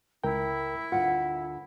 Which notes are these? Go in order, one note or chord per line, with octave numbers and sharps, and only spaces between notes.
C#2 E4 A#4 G5
D2 F3 F4 F#5